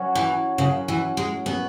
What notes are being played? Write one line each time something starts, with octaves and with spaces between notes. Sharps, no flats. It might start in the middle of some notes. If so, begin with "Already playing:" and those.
Already playing: F#3 C#4 F#4
E3
C#3 F#3 C#4 F#4
E3
G#3
F#3 B3 C#4 G#4